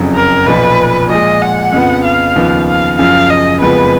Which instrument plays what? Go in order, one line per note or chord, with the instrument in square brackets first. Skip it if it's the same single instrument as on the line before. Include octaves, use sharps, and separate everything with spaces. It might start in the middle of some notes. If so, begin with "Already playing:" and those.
Already playing: [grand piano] F#1 F2 C#3 F#3
[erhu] A#4
[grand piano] B1 A#2 F3 [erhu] B4
[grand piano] A#2 F3 G#3 [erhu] D#5
[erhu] F#5
[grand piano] F2 C#3 F3 B3
[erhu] F5
[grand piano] D#2 C#3 F3 B3
[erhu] F5
[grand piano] F#1 F#2 C#3 F3 [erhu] F5
[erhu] D#5
[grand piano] F#1 F2 F3 G#3 B3 [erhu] B4